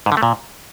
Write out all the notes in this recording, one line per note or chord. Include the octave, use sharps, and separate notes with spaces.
G#2
D3
A3
A#2